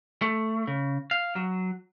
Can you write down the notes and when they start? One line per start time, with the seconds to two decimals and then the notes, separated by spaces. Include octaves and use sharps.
0.22 A3
0.67 C#3
1.11 F5
1.36 F#3